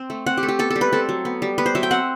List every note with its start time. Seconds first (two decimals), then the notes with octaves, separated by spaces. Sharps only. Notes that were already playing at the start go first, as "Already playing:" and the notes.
Already playing: C4
0.10 A3
0.26 C4 F#5
0.37 G4
0.43 A3
0.48 G4
0.59 B3 A4
0.71 A4
0.76 G3
0.81 B4
0.93 C4 A4
1.09 F#3
1.25 B3
1.42 G3
1.58 B3 B4
1.66 C5
1.75 F#3 E5
1.83 G5
1.91 C4 F#5